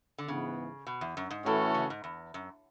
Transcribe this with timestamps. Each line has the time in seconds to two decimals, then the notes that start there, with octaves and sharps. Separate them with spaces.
0.18 D3
0.28 G#2 C#3 E3 B3
0.87 B2
1.01 E2
1.17 F#2
1.31 G#2
1.45 A2 E3 A3 C#4 F#4 A4
1.74 C#3
1.90 G#2
2.04 E2
2.34 F#2